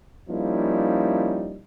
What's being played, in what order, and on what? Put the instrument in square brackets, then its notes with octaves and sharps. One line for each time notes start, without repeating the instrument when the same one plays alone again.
[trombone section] F3 G3 A#3 C#4 D#4 E4